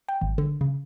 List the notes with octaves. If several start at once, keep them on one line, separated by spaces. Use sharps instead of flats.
G5
G#1
D3
C#3